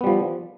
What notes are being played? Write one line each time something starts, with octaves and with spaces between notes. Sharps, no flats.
F3 G3 B3